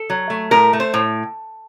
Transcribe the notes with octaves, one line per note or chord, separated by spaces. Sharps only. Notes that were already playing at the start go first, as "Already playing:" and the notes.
Already playing: A4
F#3
A3
A2 A#4
A3
C5
A2